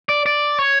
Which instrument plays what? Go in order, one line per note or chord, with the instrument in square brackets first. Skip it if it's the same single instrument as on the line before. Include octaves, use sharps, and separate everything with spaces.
[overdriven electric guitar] D5
D5
C#5